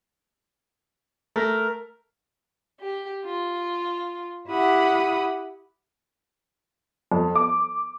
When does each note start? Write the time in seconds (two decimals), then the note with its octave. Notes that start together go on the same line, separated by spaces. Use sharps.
1.36 A3 A#4
2.81 G4
3.25 F4
4.49 E4 G4 F#5 B5 D#6
7.12 F2
7.35 D6